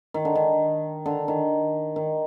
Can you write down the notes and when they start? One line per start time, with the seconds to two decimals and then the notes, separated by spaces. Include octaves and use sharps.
0.14 D#3
0.25 D3
0.35 D#3
1.06 D3
1.28 D#3
1.96 D#3